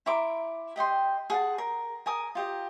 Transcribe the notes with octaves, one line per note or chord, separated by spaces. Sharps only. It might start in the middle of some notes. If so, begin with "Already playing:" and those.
E4 A#5 C6 D6
G4 D#5 G5 C6
G#4 F#5 A5
A#4
A#4 G#5 D#6
F4 G4 D#5